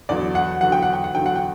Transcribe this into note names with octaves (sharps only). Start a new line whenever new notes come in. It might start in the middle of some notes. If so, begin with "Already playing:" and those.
E2 D3 F#3 D5
F#5
E2 D3 F#3 F#5
G5
F#5
G5
F#5
E2 D3 F#3 G5
F#5
G5